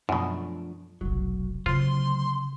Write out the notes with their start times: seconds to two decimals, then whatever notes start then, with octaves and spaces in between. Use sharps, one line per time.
0.09 F#2 B2 F3 A3 D4
1.01 F1 B1 F#3
1.66 D2 C#3 F#3 F4 C5 C6